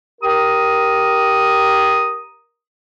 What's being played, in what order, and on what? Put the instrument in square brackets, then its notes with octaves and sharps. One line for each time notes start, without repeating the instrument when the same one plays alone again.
[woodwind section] G4 A#4 A#5 D#6